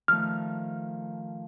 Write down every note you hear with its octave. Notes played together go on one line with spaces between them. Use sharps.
D#3 F3 A3 F6